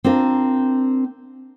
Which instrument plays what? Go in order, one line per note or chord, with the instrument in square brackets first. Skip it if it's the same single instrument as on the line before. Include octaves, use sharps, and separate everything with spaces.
[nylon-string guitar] C4 D4 F4 A#4